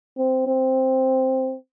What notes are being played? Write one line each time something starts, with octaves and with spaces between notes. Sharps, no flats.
C4
C4